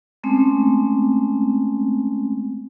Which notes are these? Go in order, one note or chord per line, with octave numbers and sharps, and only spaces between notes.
G#3 A3 C4 C#4